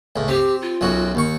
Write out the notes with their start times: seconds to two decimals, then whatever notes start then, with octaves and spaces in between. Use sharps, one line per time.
0.16 C#2 A2
0.28 C4 G4
0.61 F4
0.81 B1 F#2 F#4
1.15 D#2 C#6